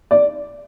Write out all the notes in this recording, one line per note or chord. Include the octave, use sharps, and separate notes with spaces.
D5